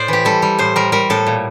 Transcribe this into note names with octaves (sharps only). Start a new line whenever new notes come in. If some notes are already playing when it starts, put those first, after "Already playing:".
Already playing: A2 C5 D5
E3 G4
G3 A4
G3
A2 C5
G3 A#4
G3 A#4
A2 A4
A#2